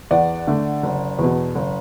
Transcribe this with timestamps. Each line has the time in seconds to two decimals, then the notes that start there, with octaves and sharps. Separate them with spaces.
0.11 E2 D5 F#5
0.47 D3 A3
0.83 F#1
1.19 E2 B2
1.55 F#1